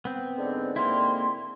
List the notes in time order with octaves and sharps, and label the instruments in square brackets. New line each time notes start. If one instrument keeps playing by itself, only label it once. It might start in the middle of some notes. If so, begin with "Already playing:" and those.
[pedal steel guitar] B3 C4
[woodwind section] G#2 D3
[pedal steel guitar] A#3 C4 E4 [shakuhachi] C6